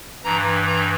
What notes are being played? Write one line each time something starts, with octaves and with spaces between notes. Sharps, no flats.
G2 E3 A#5
A#5